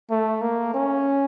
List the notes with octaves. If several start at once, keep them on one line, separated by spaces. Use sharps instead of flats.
A3
A#3
C#4